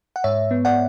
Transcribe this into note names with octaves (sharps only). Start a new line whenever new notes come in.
F#5
G#2 C#5 E5
B3
D5 F#5